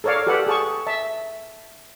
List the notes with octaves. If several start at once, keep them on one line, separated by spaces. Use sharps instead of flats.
A4 A#4 C#5 D5 F5
G4 A4 B4 F#5
G#4 A5 C#6
E5 A5